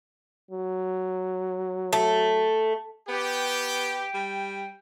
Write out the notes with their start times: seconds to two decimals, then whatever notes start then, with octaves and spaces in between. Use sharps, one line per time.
0.51 F#3
1.93 A3
3.09 B3 G4 G5
4.14 G3